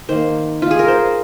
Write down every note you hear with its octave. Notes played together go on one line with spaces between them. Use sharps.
D#3 A#3 C5
F4
G#4
A#4
C5